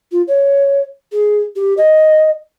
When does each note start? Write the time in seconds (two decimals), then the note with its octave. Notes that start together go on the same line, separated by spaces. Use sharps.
0.12 F4
0.28 C#5
1.12 G#4
1.56 G4
1.77 D#5